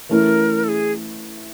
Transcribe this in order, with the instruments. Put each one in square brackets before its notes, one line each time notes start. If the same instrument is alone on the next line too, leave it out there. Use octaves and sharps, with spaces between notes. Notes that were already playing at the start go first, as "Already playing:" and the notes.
[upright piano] E3 A3 C#4 E4 [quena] A#4
[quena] A4
G#4